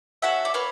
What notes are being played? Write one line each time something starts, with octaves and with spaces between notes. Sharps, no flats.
C#4 F#4 A4 E5 F#5
D5
A#3 B4 C#5